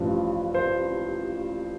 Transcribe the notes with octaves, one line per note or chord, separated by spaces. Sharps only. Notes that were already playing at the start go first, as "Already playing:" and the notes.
Already playing: A1 G2 F3
C5